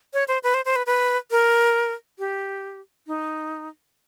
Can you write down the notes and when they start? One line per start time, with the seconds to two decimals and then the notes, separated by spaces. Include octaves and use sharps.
0.14 C#5
0.28 C5
0.43 B4
0.54 C5
0.65 C5
0.76 B4
0.86 B4
1.31 A#4
2.19 G4
3.07 D#4